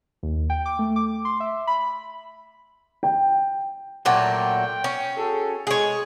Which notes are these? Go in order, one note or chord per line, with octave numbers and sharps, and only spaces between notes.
D#2
G5
D6
A3
D6
C6
E5
B5
G5
A#2 F#3 A3 G5
C#4
F#4 G#4 A4
G#3 G#4 C#5